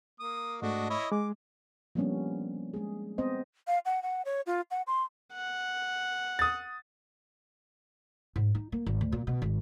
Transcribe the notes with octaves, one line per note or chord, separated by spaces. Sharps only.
A#3 D#6
G#2 A3 D4 F#4 D#5
E4 C#5 D#5
G#3 D6
F3 G3 A#3 B3 C#4 D4
G#3 G#4
B3 C4 C5 D#5
F5
F#5
F#5
C#5
F4
F#5
C6
F#5
D#6 A6
G#2
D#4
A#3
G#1
D2
A#2
B2
G#1